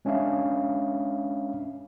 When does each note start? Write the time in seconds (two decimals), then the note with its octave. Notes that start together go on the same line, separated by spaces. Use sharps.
0.05 G#3 C#4 D4 E5 F5